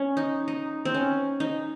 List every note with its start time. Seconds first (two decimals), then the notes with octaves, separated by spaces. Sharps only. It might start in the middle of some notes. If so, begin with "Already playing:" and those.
Already playing: C#4
0.17 D#4
0.48 D#4
0.85 C4
0.95 C#4
1.40 D#4